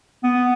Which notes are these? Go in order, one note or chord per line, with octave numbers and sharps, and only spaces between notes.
B3